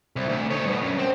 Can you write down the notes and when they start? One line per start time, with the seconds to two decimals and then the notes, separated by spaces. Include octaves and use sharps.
0.16 C2
0.29 D2
0.51 D#4 C#5
0.66 G2 B2
0.82 F#2
0.98 C4